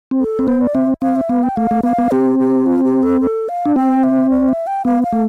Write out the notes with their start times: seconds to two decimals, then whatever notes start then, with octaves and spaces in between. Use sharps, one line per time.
0.11 C4
0.20 A4
0.39 C4
0.47 B3 C5
0.61 D5
0.75 C4 E5
1.02 C4 F5
1.16 E5
1.29 B3 F5
1.43 G5
1.56 A3 F5
1.71 A3
1.83 B3 F5
1.98 B3
2.11 C4 G4
2.39 G4
2.66 F4
2.84 G4
3.03 A4
3.21 A4
3.49 F5
3.66 D4
3.75 C4 G5
4.04 E5
4.30 D5
4.49 E5
4.67 G5
4.85 B3 F5
5.03 F5
5.13 A3